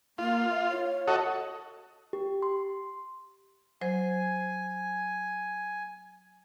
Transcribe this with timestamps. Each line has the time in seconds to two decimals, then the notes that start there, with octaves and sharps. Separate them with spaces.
0.18 A#3 F4
0.50 E5
0.69 C#5
1.08 F#4 A4 D#5
2.13 G4
2.42 C6
3.81 F#3 C5 G#5